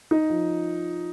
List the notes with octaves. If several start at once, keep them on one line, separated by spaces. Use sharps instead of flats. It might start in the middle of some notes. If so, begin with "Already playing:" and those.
D#4
F3